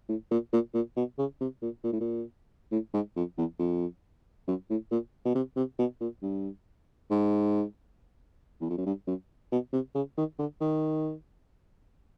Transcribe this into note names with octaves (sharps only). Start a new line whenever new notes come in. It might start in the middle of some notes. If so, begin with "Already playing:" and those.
A2
A#2
A#2
A#2
B2
C#3
C3
A#2
A#2
A2
A#2
A2
G#2
F2
E2
F2
F#2
A2
A#2
B2
C3
C3
B2
A#2
G2
G#2
E2
F2
F#2
G2
F#2
B2
C3
C#3
D#3
D3
D#3